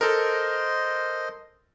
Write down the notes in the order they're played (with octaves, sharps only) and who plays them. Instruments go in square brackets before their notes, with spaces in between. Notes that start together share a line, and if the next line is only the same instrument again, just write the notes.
[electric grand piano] A4 A#4 [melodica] C5 D#5